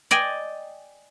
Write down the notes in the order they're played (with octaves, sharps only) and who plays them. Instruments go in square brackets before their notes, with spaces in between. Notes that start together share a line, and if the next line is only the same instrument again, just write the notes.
[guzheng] D5 D#5 G5 G#5